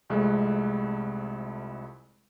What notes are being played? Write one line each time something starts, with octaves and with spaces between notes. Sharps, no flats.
C2 F2 G#3 A3 F#6